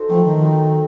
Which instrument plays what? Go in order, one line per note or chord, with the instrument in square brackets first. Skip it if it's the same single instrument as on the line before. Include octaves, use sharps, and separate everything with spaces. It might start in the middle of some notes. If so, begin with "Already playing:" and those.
Already playing: [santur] D#4 F#4 A4 C5
[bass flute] F3 [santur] F#3 A3 C4
[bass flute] D#3
[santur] F#3 C4 D#4